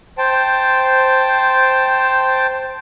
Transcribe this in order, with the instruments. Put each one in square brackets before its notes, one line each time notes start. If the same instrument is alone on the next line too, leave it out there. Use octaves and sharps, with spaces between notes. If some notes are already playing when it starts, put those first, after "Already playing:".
[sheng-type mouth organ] C5 G5 A5